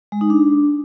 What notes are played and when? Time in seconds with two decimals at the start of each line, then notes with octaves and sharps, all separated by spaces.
0.12 G#3
0.21 D#4
0.30 D4